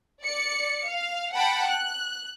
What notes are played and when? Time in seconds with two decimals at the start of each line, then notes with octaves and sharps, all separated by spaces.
0.23 D5 C#7
0.87 F5
1.33 F#5 G5 A5 B5
1.68 F#6